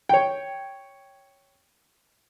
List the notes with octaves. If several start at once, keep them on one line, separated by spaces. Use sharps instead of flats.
C#5 G5